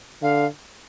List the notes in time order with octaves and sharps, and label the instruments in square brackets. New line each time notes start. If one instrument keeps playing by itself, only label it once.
[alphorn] D3 [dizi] F5